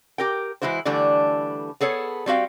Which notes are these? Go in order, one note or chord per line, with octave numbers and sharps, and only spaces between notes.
G4 A#4 G5
E3 G#3 E4 F#4 C5
D3 E3 G3 A3 D4
B3 G#4 A4 C#5
G3 C4 F#4 F5 G5